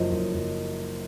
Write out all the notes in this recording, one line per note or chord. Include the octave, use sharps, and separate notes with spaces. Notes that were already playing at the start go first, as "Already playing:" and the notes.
Already playing: F#1 F#2 F3 C5 C#5 D#5
F#1
F#1